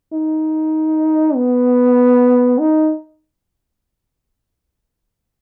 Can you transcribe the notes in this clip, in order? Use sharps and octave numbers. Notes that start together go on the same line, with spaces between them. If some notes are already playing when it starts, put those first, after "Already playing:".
D#4
B3
D#4